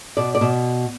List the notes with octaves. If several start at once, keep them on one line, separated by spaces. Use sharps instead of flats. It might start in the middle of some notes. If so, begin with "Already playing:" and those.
B2 D5
D5
B2